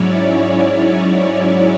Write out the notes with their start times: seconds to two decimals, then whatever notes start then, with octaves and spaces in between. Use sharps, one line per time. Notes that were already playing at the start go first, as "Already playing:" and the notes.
Already playing: G#2 F#3 C#4 E4 C#5 D5
0.38 D5